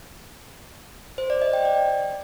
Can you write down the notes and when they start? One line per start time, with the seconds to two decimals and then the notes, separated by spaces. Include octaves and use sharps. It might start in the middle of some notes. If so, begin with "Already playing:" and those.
1.18 C5
1.30 D5
1.42 D#5
1.53 G5
1.65 D5